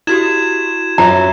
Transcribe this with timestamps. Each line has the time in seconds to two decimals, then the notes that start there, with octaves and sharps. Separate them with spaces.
0.07 E4 F#4 G4 G#6 E7
0.98 F#2 F#3 F4 E5 A#5